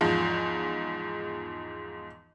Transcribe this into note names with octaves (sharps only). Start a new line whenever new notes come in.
E2 G#2 F3